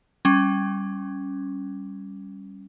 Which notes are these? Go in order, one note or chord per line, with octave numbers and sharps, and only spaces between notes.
G3 C#4